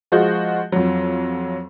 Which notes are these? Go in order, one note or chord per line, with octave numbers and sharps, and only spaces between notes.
F3 G#3 F4 F#4 D#5 G6
F2 F#3